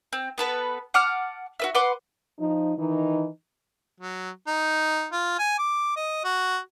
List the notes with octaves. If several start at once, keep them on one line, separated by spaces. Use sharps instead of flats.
C4
B3 A4 B4
F#5 A5 D6 F6
F#4 B4 E5
B4 F#5 C6 D6
F3 D#4
D#3 E3 D#4
F#3
D#4
F4
G#5
D6
D#5
F#4